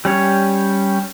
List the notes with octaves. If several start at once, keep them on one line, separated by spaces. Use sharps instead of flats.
G3 C#4 C#5